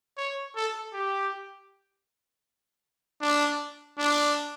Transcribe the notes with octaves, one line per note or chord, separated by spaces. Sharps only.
C#5
A4
G4
D4
D4